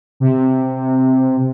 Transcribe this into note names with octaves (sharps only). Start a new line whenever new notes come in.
C3